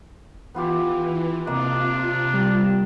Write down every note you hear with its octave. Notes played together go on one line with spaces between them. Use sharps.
E3 B3 F4 G4
C3 A#3 D4 F4 D#5 D#6
G3